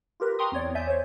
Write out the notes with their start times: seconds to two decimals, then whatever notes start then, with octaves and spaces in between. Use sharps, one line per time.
0.20 F4 G4 A#4 B4
0.39 G5 A#5 C6 C#6 D#6
0.52 E2 C4 C#5 D5
0.74 E2 D5 E5 G#5 G6
0.87 C5 C#5